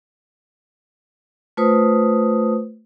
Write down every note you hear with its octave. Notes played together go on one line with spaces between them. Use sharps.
A3 F4 B4 C5 D#6